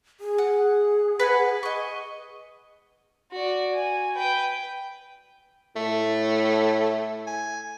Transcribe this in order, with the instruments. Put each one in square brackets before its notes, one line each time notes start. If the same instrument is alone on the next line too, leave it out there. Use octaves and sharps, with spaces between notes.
[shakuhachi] G#4
[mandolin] F#5
B4 F#5 G#5
D#5 C#6
[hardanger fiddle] F#4 D5
G#5
B4 G5
[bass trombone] A2 [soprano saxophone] A3
[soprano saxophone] G#5